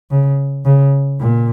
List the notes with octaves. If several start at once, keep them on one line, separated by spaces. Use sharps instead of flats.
C#3
C#3
A#2